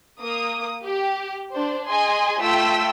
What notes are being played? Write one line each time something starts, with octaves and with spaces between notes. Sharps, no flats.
A#3 D#6
G4
D4 C5
G#4 D#5 G#5 C6
A3 F4 G5 E6 B6